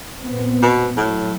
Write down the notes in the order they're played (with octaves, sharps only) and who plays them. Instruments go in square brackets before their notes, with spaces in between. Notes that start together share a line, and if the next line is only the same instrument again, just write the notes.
[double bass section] A#2 B3 C4
[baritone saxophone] B2
[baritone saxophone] A2 [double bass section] F#3